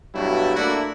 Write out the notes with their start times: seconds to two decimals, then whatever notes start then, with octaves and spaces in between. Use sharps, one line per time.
0.14 G2 B2 F#3 A3 E4
0.56 A3 A#3 D4 E4 F#4